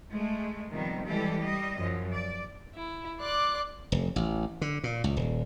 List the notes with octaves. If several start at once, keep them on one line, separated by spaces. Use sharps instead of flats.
G#3 A3
C3 D#3 F3 G3 B3
E3 G3 G#3 G4 A4
G3 D#5
F#2 F3
D5
E4
D5 C6 D6 F#6
F1
A1
D3
A#2
C#2
D#1